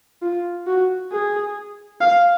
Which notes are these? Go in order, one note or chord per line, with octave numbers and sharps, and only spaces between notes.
F4
F#4
G#4
F5